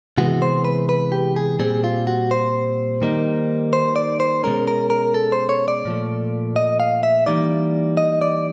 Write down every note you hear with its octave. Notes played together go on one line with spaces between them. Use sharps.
C3 E3 G#3 B3 F#4
C5
B4
B4
G4
G#4
A#2 G3 C4 G#4
F4
F#4
C5
D#3 G3 A#3 D#4
C5
D5
C5
B2 G#3 C#4 A#4
A#4
A#4
A4
C5
C#5
D5
A#2 F3 A3
D#5
F5
E5
E3 G3 A#3 D#4 D5
D#5
D5